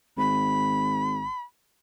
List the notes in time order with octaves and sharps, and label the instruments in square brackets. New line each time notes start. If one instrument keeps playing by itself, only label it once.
[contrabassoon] G#1 [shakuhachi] B5